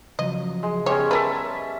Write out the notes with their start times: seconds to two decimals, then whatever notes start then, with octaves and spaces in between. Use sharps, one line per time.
0.19 C#3 F3 F#3 D#5
0.63 G#3
0.86 G3 G#3 B3 C#4 C#5
1.11 A#4 B4 E5 A5